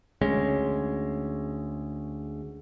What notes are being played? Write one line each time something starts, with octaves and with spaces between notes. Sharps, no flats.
D2 G#3 C#4